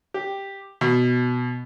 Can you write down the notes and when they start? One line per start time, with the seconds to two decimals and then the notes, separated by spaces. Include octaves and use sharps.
0.14 G4
0.81 B2